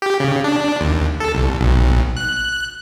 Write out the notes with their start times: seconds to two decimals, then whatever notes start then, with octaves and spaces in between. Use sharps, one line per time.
0.02 G4
0.20 C#3
0.44 D4
0.81 D#2
1.20 A4
1.34 C2
1.60 B1
2.17 F#6